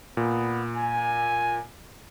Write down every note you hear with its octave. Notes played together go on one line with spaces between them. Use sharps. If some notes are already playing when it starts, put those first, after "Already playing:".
A#2 B3
G#5